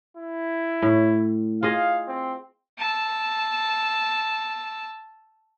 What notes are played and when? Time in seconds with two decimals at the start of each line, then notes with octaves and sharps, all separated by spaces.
0.17 E4
0.82 A2
1.63 F4 G#4 D#5 F5
2.08 C4
2.78 A5 E6